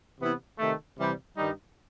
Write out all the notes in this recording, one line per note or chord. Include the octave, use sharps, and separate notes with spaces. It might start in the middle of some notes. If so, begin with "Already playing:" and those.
C3 E3 B3 E4
C3 D#3 A3
C3 E3 G3
G2 D#3 G3 D#4